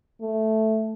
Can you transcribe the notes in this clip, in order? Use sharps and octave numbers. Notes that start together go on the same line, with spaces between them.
A3